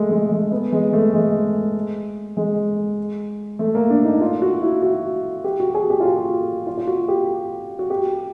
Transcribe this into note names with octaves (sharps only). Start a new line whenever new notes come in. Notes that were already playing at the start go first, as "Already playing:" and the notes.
Already playing: G#3 A3
G#3
G#3
B3
G#3
A3
G#3
G#3
A3
A#3
D4
D#4
F4
F#4
E4
F#4
G4
F#4
G#4
G4
F4
F#4
F4
F4
F#4
G4
F#4
G4